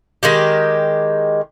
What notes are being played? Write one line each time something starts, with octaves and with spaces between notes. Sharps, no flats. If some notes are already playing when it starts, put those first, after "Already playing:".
D#3 G#3 G4